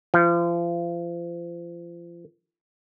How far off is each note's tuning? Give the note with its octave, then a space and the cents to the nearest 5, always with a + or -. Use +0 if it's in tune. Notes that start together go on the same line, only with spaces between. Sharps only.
F3 -35